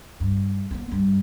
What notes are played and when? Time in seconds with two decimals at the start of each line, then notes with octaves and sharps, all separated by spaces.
0.20 G2
0.71 B3 C4
0.91 G2